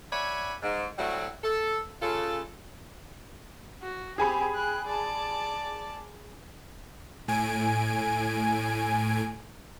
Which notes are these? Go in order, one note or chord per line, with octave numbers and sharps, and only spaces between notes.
C#5 D5 E5 F#5 G#5 B5
G#2
F#3 G3 A3 C4 E4 F#4
A4
C#3 F4 A4
F#4
C4 G4 G#4 G#5 B5
G5 F#6
D5 A5
A2 G#5 D7